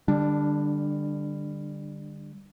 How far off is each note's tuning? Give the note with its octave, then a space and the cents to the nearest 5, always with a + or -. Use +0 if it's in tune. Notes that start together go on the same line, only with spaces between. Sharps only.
D3 +30 G3 +25 D4 +0